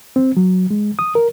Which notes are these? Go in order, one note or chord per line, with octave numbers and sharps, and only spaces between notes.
C4
F#3
G#3
D#6
A#4